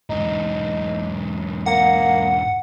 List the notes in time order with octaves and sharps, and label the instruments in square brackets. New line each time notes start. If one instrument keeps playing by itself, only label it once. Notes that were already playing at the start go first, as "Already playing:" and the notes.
[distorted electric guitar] E2 G#2 [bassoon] D#4
[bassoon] A#3 [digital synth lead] F#5